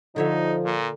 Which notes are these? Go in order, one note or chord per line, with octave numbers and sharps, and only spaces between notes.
D3 F3 D#4 C#5 E5
A#2